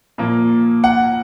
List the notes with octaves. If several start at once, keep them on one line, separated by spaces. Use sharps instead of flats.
A#2 F3 A#3
F#5